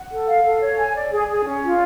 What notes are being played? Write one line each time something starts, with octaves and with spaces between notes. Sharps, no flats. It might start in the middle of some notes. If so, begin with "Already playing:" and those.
Already playing: F#5
A4
F5
A4
C#5
G#5
D5
G#4
G#4
C#4
F4